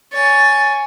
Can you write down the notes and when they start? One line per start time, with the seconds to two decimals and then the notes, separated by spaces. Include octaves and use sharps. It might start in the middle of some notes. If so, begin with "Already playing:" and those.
0.12 C#5 G#5 A6